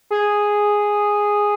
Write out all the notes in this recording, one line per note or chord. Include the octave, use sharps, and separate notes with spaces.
G#4